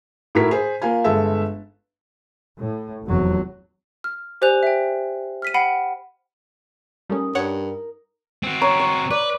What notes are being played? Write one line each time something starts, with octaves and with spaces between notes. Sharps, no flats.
A2 E4 F#4 A#4 B6
G#4 C5
A#3 F4 F5 G#5
G1 G#3 A4 E5
A2
F1 E2 F#3
F6
G4 C5 D5 G#5 F#6 F7
E5 G5
F6 B6 D#7
F#5 G5 B5 C7 D#7
G3 A3 C#4 D#4 A#4 D#6
G2 C#5 F#5
C4 F#4
C#5 A#5
C#5
B4 D5